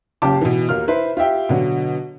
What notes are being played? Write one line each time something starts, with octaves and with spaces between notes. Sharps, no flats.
F#1 C#3 F4 G4 A5 D6
B2 E3
D#2 A#3 F4 F6
E4 B4 C5
F4 G4 E5 G5
B2 D3 F#3